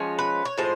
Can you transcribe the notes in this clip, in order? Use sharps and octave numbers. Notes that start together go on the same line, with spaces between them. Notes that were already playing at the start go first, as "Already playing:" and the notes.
Already playing: F3 G#3 C#4
B4
C#5
A2 F3 G#3 C5